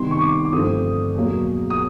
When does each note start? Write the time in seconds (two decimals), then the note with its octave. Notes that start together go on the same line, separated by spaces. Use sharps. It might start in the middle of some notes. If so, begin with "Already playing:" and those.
Already playing: C3 D#3 G3 B3 C6
0.11 C#6
0.21 D6
0.45 D6
0.53 G2 D3 F3 A3 C4 D#6
1.15 E2 B2 F#3 A#3
1.70 D#6